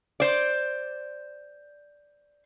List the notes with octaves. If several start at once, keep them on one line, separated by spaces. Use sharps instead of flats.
C5 D5